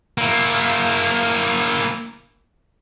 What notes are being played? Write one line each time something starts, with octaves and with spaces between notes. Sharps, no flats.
A#3 E4